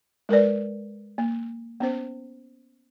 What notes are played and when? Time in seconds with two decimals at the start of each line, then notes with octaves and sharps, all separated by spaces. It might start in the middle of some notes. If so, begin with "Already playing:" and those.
0.29 G#3 A#4 B4 D5
1.18 A#3
1.80 B3 C#4 C5